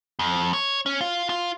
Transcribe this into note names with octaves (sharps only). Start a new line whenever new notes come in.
F2
C#5
C#4
F4
F4